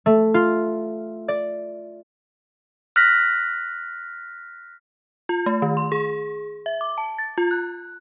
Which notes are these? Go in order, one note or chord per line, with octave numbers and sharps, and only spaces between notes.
A3
F4
D5
F6 F#6 A#6 B6
F4
A3
D#3
C6
G#4
E5
D6
A5
A6
F4
F#6